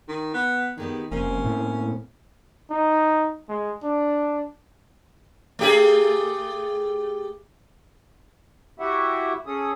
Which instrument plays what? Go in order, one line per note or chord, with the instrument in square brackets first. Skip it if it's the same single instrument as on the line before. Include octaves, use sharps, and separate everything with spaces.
[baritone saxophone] D#3
B3
[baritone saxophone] D#3 [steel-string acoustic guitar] B3 G4 G#4
[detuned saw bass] F1 [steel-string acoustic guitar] A#3 C4 [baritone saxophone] C#4
[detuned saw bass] A2
[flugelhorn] D#4
G#3
D4
[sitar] A3 G4 G#4
[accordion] E4 F#4 G4 E5 F#5
C#4 G#4 A4 D#6